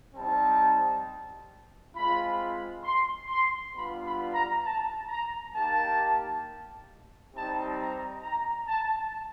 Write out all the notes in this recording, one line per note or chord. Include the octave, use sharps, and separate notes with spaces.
G3 C4 D#4 A5
G#3 C4 F4 B5
C6
C6
G3 B3 D4 F4 B5
B5
A#5
A5
A#5
A#3 D#4 G4 A5
G3 C4 D#4 G4 A5
A#5
A#5
A5